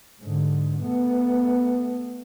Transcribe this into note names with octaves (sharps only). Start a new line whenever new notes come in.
G#2 D3
A3 B3